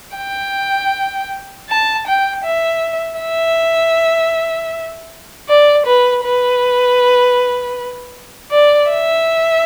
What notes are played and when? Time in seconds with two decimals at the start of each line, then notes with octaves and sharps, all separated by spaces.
0.17 G5
1.69 A5
2.07 G5
2.44 E5
3.21 E5
5.49 D5
5.86 B4
6.24 B4
8.51 D5
8.90 E5